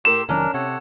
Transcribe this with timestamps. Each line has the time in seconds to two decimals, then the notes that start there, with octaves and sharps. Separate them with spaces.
0.05 A2 G4 A#4 C6 E6 E7
0.29 F1 D#3 F#3 C#4 D4 A#4
0.54 C3 A4 C#5 F#5